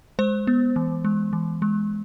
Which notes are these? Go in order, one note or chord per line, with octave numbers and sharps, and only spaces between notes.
G#3 C5
B3
E3
G#3
E3
G#3